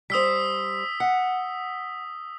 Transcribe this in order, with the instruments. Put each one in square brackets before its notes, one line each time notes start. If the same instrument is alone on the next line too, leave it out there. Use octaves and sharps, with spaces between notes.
[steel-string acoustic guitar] G3 C5 [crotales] D#6 E6 B6
[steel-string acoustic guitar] F#5